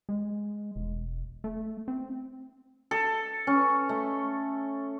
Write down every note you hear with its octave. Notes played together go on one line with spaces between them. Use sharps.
G#3
E1
A3
C4
A4
C#4
A3